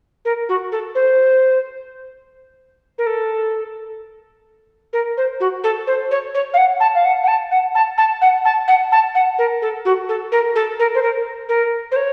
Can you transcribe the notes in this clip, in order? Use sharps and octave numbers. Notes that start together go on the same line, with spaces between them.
A#4
F#4
A4
C5
A#4
A4
A#4
C5
F#4
A4
C5
C#5
C#5
F5
F#5
A5
F5
F#5
F#5
A5
F#5
A5
A5
F#5
A5
F#5
A5
F#5
A#4
A4
F#4
A4
A#4
A4
A#4
C5
A#4
A#4
C5
C#5